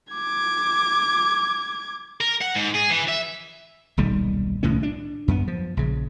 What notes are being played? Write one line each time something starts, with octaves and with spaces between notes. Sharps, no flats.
D6 G#6
A#4
F#5
G#2
G#4
E3
E5
D#1 B1 D#3 G3
C2 A2 D#3 C#4
D4
F#2 B3
F3
A#1 C#3